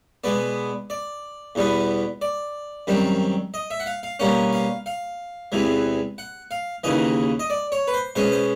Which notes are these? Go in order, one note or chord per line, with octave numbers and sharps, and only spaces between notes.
B2 G#3 B3 D5
D5
E2 B2 G3 B3
D5
F#2 D#3 G3 C4
D#5
E5
F#5
F5
F5
B2 G3 A#3 C#4 F#5
F5
F5
E2 C3 E3 G#3
F#5
F5
D#2 C#3 E3 D#5
D#5
D5
C#5
B4
C5
B2 G#3 C#4 C5
C5